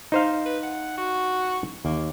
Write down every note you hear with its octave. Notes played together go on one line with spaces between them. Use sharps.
D#4 C5 F5
B4
F#5
F#4
D#2 A#3